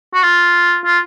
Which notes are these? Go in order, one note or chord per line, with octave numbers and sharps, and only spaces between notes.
F#4
F4
F4